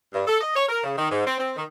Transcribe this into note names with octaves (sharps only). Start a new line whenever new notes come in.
G2
A4
D#5
C#5
A#4
C#3
D#3
G#2
C4
C4
D#3